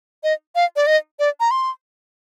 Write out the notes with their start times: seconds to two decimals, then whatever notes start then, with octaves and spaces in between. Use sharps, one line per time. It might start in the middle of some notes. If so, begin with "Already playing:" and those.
0.23 D#5
0.55 F5
0.76 D5
0.87 D#5
1.19 D5
1.40 A#5
1.51 C6